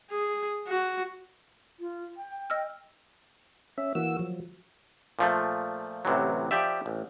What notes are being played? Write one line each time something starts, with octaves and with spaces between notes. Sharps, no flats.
G#4
F#4
F4
G5
D#5 E6 F6
C#4 E5
E3 A#3 F#4 E6
F3 F#3
A#2 F3 A3
A1 C3 E3 F#3
F3 G4 D5 E5
A1